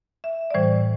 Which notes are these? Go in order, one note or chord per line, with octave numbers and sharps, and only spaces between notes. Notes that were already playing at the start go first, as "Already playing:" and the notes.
E5
D5
A2 E3 G3 C5